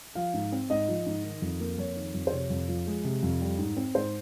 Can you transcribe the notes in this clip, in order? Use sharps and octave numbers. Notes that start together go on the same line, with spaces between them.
F3 F5
G#2
C4
G#2 D#5
F3
G#2
D#3
F2
A#3
F2 C#5
D#3
F2
C5
C3 C#5
F2
F3
G#3
C3
F2
G3
G#2
C4
G#2 C5